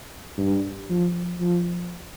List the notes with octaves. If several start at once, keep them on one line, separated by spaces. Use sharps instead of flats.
G2
F3
F3